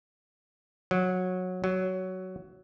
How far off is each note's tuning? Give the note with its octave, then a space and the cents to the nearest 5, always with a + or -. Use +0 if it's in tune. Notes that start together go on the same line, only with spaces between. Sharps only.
F#3 -15
F#3 +10